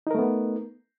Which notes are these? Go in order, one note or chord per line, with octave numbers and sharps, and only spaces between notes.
A3 B3 D#4 A#4